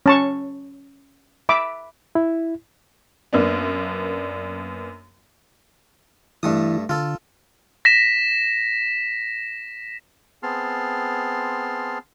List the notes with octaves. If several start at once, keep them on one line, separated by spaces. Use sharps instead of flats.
C#4 A5 C#6
E5 B5 D6
E4
F#2 A#3 B3 D4
G2 E3 A3 E4 D#6
D3 F4 A4
A#6 B6 E7
B3 C4 G#4 A5 C6 F6